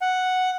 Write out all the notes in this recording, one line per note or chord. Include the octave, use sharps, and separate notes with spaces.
F#5